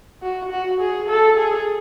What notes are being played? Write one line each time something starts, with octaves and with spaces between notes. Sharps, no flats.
F#4
F#4
G#4
A4
G#4